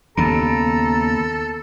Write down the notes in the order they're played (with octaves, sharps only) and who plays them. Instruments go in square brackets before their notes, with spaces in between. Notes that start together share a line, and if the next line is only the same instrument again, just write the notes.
[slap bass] D#2 C#3 [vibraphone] B3 [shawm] A4 [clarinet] A#5